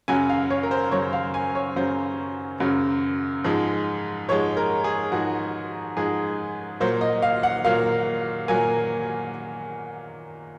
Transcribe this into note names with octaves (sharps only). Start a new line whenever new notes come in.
F#2 C#3 F#3 G#5
F5
C#5
A#4
C5
F#2 C#3 F#3 C#5
F5
G#5
C#5
F#2 C#3 F#3 C5
F#2 C#3 F#3
G#2 F3 G#3
G#2 F3 G#3 C#5
A#4
G#4
G#2 F3 G#3 F#4
G#2 F3 G#3 G#4
A#2 F#3 A#3 C5
D#5
F5
F#5
A#2 F#3 A#3 F5
A#2 F#3 A#3 G#5